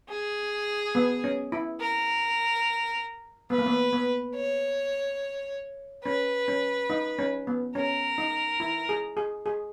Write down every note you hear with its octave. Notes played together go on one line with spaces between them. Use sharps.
G#4
B3
C#4
E4
A#4
B3 B4
A#3
B3
B3
C#5
C#4 B4
C#4
D#4
C#4
B3
C#4 A#4
D#4
E4
G#4
G#4
G#4